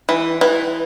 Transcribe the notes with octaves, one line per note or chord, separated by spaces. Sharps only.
E3
E3